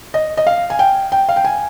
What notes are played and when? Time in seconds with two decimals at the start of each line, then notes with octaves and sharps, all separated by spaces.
0.14 D#5
0.37 D#5
0.47 F5
0.70 G#5
0.79 G5
1.12 G5
1.29 F5
1.36 G5
1.45 G#5